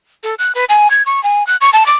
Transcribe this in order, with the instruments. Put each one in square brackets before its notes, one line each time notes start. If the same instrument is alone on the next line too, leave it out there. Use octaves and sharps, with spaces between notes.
[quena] A4
F#6
B4
G#5
G#6
C#6
G#5
F#6
C#6
A5
D6